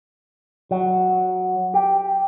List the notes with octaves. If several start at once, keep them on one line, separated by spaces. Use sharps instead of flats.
F#3
G4